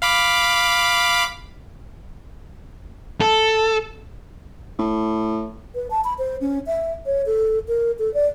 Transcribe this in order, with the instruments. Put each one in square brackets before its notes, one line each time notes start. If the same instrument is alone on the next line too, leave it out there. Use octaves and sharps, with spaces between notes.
[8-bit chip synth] F5 B5 D6
[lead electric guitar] A4
[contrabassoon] A2
[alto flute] B4
A5
B5
C5
C#4
E5
C#5
A4
A#4
A4
D5